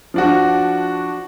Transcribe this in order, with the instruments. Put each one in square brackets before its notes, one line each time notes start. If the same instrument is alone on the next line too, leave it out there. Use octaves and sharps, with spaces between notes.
[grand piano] F3 D4 F#4